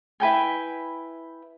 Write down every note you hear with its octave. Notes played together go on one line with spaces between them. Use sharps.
E4 B4 G5 G#5